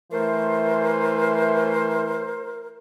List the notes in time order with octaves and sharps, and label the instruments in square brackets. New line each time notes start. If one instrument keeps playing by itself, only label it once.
[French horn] E3 [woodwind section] A3 C5 [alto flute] A#4